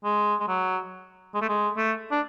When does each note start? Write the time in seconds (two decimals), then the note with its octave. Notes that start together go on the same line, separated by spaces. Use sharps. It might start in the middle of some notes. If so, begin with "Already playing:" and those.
0.04 G#3
0.40 G#3
0.48 F#3
1.34 G#3
1.42 A3
1.49 G#3
1.77 A3
2.11 D4